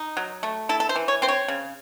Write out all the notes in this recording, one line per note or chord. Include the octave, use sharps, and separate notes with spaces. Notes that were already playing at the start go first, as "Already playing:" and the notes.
Already playing: D#4
F#3
A3
E4 A4
A4
C5
E3
C#5
C4 C5
C#5
C#3